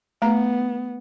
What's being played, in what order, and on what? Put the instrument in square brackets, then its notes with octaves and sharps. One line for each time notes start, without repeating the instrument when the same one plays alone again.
[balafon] A3 A#5 [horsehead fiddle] B3